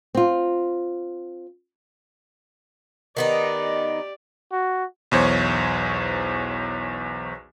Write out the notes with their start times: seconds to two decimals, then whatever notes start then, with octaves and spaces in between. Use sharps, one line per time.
0.15 C4 F4
3.17 D#3 B3 D#4 G4 D5
4.52 F#4
5.11 B1 E2 C5 C#5